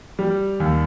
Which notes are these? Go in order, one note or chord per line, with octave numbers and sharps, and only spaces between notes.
G3
D#2